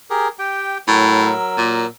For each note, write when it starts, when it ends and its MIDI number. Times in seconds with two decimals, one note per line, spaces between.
0.10 0.28 67
0.10 0.28 68
0.10 0.28 70
0.39 0.78 67
0.39 0.78 79
0.88 1.33 45
0.88 1.86 54
0.88 1.86 70
0.88 1.86 88
1.58 1.86 46